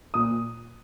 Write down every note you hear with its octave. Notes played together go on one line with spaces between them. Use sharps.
A#2 D#6